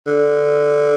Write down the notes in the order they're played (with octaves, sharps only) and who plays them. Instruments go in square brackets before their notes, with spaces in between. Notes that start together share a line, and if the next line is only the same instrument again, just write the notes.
[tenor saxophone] D3